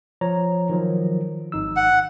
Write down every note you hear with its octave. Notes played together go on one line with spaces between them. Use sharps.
F3 C#5 A#5
D#3 F3 F#3
G#1 D#4 E6
F#5